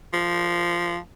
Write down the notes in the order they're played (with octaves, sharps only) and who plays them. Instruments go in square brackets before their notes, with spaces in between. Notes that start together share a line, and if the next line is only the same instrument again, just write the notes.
[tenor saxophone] F3